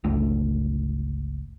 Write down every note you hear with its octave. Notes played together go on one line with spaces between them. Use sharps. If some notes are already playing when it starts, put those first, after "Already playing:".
G1 C#2 A3 D4